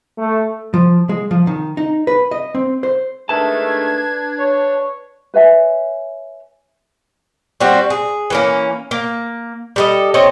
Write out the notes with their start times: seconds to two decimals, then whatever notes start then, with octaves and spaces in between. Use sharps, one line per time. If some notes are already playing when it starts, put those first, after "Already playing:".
0.18 A3
0.74 F3
1.09 G#3
1.31 F3
1.47 D#3
1.77 D#4
2.07 B4
2.31 D#5
2.55 C4
2.83 C5
3.29 D#3 G#3 A3 D4 B4 A5 G#6
4.39 C#5
5.34 B4 C#5 E5 G#5
7.60 G3 C4 F#4
7.90 G#4
8.30 E3 A#3 C#4
8.91 A#3
9.76 G3 A4 D#5
10.14 C4 A4 C#5 D#5